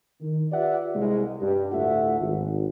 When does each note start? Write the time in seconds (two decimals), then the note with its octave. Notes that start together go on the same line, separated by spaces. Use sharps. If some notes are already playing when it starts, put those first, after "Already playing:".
0.21 D#3
0.52 F4 G4 B4 D5 E5 F#5
0.95 C2 C3 G#3
1.41 G2
1.72 D2 A2 A3 F4 E5 F#5
2.21 G#1